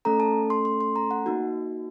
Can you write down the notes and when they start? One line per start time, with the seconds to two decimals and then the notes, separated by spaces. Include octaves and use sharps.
0.05 A3 C#4 A4 A#5
0.20 A5
0.50 C6
0.65 C6
0.81 C6
0.96 A#5
1.11 F#5
1.26 A#3 D#4 F#4